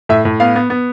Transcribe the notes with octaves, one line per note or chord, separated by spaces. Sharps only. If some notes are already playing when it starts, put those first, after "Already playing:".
A2 E5
A2
B3 F5
B3
B3